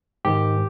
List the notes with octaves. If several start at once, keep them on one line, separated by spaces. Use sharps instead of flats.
G#2 D#3 G4